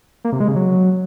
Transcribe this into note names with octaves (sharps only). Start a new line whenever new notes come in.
A#3
C3
G#3
C#3
F#3